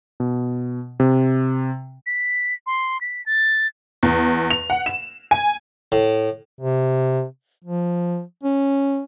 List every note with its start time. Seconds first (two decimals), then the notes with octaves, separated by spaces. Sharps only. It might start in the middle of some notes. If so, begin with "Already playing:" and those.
0.20 B2
1.00 C3
2.07 B6
2.67 C6
3.01 B6
3.26 A6
4.03 E2
4.51 F7
4.70 F#5
4.86 E7
5.31 G#5
5.92 A2
6.61 C3
7.64 F3
8.43 C#4